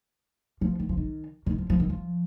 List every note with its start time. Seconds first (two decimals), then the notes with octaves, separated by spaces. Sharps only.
0.61 F3
0.79 D#3
0.89 F3
0.97 D#3
1.46 D#3
1.58 F3
1.70 F3
1.80 D#3
1.90 F3